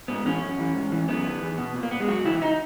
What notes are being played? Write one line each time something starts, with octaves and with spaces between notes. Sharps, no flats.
G#2 B3
E3 C#4
F#2
E3
G#2
E3
F#2 B3
D#3
E2
B2
A#2
A#3
B3
G#3
F#2 F#4
C#3 E3 E4
D#4